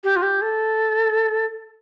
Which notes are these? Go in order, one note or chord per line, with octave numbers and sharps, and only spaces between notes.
G4
F4
G4
A4